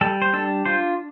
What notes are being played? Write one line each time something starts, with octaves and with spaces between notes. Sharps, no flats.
G3 A4
C5
D4 A4
F4 C5